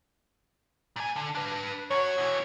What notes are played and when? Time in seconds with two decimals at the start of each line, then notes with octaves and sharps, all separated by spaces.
0.96 A#2 G#5
1.16 D3
1.35 D4 B4
1.91 F#2 F#4 C#5
2.18 B2 E3